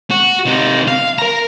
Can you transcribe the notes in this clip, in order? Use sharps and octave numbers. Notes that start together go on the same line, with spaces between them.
F#4
C3 D#4
F5
A#4 A#5